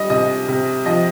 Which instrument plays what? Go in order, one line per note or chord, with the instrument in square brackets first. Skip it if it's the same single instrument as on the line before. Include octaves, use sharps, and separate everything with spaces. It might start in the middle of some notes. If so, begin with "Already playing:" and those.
Already playing: [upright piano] G3 D#5
C3 D#5
C3
F3 D#5